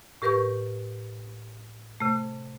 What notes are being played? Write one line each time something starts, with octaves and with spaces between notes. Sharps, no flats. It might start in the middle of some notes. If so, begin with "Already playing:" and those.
A2 G4 A#4 B4 C#6 G6
C3 A3